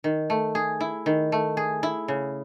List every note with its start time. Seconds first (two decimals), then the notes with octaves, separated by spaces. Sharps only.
0.04 D#3
0.30 A3
0.55 G#4
0.80 E4
1.06 D#3
1.32 A3
1.57 G#4
1.83 E4
2.08 C#3